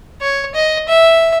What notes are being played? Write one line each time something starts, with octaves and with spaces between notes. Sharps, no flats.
C#5
D#5
E5